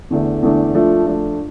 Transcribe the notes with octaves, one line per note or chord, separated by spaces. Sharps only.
E2 D3 A3 D4
E2 D3 A3 D4
F3 A3 D4 F4
F3 A3 D4 F4